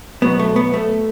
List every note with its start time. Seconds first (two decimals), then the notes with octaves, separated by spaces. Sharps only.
0.22 B2 F#3 B3
0.39 A3
0.56 B3
0.74 A3